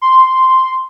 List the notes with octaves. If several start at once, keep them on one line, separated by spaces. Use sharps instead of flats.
C6